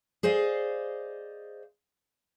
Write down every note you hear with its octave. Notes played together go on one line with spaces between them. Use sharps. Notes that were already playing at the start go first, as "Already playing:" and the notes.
G#4 C5 D5 D#5 F5